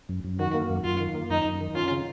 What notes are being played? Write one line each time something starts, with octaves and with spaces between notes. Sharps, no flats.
F#2
F#2
D#3 F#4
A#3
F#2
F#2 F4
D#3
A#3
F#2 D#4
F#2
D#3
C#4 F4
C#3